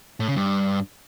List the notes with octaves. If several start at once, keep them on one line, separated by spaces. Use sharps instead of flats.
A2
C#3
G2